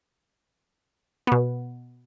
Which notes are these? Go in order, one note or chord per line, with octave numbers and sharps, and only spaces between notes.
B2 B3